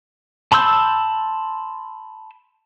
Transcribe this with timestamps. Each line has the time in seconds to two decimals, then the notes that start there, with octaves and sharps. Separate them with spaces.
0.52 A5 B5 C6 E6 G6